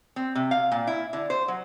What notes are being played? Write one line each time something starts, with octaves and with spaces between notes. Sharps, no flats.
C4
C3
F5
A#2
E4
D3
C5
F#3